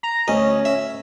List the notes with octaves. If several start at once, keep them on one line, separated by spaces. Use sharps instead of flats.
A#5
D2 C#4 D#5
E5